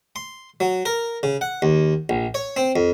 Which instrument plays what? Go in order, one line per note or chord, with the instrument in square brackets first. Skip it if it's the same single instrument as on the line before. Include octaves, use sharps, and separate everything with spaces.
[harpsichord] C6
F#3
A#4
C#3
F#5
D#2
A#1
C#5
C4
F2